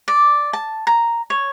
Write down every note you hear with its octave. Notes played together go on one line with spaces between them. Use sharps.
D5
A5
A#5
C#5